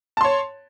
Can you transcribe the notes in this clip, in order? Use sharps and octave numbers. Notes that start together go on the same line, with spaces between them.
C#5 A5 C6